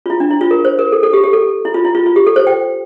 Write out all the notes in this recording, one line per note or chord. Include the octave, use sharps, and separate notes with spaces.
F4
E4
D4
E4
F4
A#4
C5
A#4
A4
A4
G4
G4
A4
E4
F4
E4
F4
F4
G4
A4
C5
G5